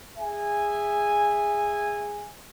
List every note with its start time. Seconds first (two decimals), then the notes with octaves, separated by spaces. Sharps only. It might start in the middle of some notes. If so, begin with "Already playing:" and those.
0.18 G#4 E5 G#5